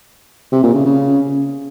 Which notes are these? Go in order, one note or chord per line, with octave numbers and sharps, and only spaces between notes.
C3
A#2
C#3
C#3